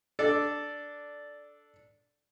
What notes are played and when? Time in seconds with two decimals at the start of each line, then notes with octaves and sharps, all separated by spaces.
0.19 D4 A4 D5